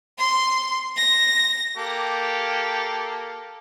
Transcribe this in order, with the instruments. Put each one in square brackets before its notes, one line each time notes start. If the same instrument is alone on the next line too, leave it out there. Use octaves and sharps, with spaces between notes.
[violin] C6
A#6
[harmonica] A#3 G4 A4